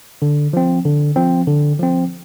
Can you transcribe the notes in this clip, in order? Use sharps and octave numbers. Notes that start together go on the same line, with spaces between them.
D3
F3 C4
D3
F3 C4
D3
F3 C4